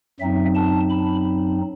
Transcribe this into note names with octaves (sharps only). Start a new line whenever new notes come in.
F#2 F#3 C4 D#4 E5
A5
B5